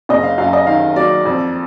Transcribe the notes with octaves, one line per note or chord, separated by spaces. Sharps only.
F#1 D#5
F5
F#2 F5
D#5
D#3 F5
F#3 D5
F2